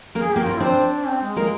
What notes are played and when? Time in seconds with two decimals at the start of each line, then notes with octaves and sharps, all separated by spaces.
0.15 A#3 A#4
0.20 G#4
0.33 A#3 G4 A#4
0.46 A#3 F4 A#4
0.60 C4 D4 C5
1.07 C4
1.22 G#3
1.36 G#3 A#3 A#4